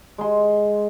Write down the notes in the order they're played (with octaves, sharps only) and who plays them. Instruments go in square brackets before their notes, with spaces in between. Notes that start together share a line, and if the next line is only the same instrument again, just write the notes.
[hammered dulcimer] G#3 C6